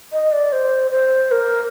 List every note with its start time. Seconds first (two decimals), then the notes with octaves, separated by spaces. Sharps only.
0.12 D#5
0.32 D5
0.52 C5
0.91 C5
1.31 A#4